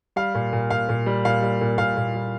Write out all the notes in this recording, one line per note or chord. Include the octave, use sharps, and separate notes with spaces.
G3 F5
A#2
A#2
A#2 F5
A#2
G3
A#2 F5
G3
A#2
A#2 F5
A#2
G3